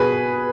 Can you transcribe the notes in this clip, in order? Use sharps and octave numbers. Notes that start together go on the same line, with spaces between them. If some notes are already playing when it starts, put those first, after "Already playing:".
Already playing: B2 G#4 B4